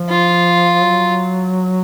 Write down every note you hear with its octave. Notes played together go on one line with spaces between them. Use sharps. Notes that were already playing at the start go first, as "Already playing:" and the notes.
Already playing: F3
F4
F#3